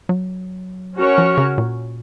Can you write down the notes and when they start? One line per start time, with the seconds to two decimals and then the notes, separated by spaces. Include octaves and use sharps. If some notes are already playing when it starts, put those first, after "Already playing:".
0.09 F#3
0.97 C#4 F#4 A#4 C#5
1.18 F3
1.37 C#3
1.58 A#2